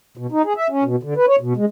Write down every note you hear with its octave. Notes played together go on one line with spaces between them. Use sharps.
B2
D#4
G#4
E5
C#4
B2
D3
B4
C#5
B2
G#3